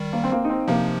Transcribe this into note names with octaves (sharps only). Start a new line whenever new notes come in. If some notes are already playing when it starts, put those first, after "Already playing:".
Already playing: D#3 G3
A#3
C4
A#3
D#4
C4
C3 F3 A#3